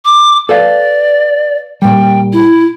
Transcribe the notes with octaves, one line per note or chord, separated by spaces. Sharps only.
D6
A4 B4 D5 F5
A#2 G3 G5
E4